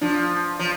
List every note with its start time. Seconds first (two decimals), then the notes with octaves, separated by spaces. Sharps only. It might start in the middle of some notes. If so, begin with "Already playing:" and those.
0.01 F3 D4
0.59 F3